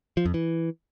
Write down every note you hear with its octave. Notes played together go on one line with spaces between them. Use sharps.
F3
F2
E3